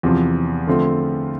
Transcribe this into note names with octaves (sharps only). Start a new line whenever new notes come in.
E2 C3 F3
D3 F3 A3 C4